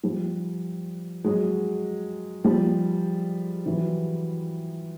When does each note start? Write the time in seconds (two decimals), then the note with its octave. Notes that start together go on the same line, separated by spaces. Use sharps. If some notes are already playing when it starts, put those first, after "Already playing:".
0.03 F3 G3
1.24 F#3 G#3
2.44 F3 G3
3.66 E3 F#3